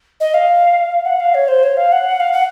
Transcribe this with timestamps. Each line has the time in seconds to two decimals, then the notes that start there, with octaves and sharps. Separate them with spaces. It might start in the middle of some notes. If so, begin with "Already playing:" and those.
0.20 D#5
0.34 F5
1.05 F#5
1.20 F5
1.34 C#5
1.48 C5
1.63 C#5
1.77 F5
1.92 F#5
2.20 F5
2.33 F#5